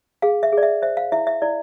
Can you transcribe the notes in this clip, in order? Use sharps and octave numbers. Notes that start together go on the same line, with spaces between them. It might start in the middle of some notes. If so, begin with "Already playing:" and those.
G#4 F5
E5
G#4
D5
E5
C5 E5
F5
E4 E5
E5
E4 D5